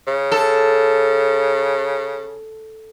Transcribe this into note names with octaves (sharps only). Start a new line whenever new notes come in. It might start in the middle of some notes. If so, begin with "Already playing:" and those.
C#3
A4